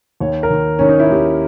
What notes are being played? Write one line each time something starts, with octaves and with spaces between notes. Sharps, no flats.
D#2 C#5
A#4
D#3
D#3 C#4
D#4
E4
D#2 G4